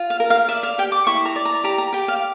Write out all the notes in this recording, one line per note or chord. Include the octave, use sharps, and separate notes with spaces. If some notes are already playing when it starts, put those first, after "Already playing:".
Already playing: F4
F5
A#4
F5
D5 E5
F5
G4 G5
D6
E4 C#6
A#5
D5
A#5
G4 A#5
A#5
G4 G5
F5